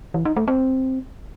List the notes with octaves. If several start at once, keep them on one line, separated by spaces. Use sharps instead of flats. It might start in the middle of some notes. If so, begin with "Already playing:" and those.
E3
D#4
A3
C4